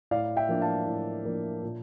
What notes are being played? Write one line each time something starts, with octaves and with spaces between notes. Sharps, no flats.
A2 D5 F5
E5 G5
F3 A#3 D4
F5 A5
A2
F3 A#3 D4
A#2